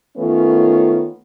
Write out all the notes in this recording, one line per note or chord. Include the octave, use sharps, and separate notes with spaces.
D#3 A3 B3 C#4 F4